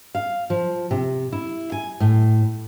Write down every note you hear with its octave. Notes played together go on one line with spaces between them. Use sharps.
F5
F3
C3
E4
G#5
A2